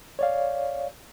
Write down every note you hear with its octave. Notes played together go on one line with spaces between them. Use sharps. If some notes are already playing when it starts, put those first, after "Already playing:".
C#5 D5 F5